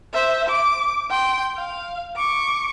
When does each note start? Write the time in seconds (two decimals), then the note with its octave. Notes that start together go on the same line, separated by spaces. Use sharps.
0.13 C5 E5
0.49 D6
1.10 G5 C6
1.57 F5
2.16 C#6 D6